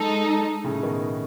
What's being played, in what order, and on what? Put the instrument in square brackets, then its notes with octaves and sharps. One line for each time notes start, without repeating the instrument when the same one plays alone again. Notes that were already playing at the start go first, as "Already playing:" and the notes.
Already playing: [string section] G#3 D#4 A4
[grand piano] A2 C#3
B2 D#3